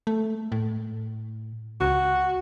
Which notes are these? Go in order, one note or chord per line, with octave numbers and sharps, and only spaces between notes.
A3
A2
C#2 F#4